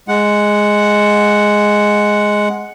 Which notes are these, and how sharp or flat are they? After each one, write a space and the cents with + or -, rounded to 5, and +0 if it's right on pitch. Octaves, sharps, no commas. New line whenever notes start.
G#3 +0 F#5 +0